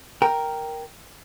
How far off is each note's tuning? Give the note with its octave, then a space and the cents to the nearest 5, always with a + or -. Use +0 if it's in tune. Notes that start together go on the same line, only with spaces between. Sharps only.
A#4 +0 G5 +0